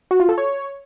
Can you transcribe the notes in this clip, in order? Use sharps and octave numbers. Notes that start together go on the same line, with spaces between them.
F#4
F4
A4
C#5